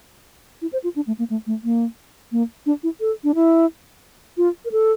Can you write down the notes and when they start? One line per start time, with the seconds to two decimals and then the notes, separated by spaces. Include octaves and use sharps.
0.62 E4
0.73 C5
0.84 F4
0.96 D4
1.07 A3
1.19 A#3
1.30 A3
1.47 A3
1.64 A#3
2.32 A#3
2.66 D4
2.83 E4
3.01 A4
3.24 D4
3.35 E4
4.37 F4
4.65 A#4
4.72 A4